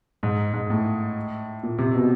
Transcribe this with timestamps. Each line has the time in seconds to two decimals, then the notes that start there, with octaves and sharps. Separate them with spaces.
0.23 G#2
0.53 G#2
0.70 A2
1.63 A#2
1.78 C3
1.94 B2